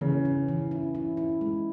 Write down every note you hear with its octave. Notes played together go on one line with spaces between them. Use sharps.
C#3 E3
C#4
E3
E4
E4
E4
G#3